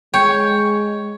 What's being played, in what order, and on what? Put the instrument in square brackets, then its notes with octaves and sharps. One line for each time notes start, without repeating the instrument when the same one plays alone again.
[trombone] G#3 [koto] C#5 [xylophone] G5 G6